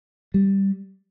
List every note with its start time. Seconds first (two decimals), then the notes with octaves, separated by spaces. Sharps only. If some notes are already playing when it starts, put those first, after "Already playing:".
0.34 G3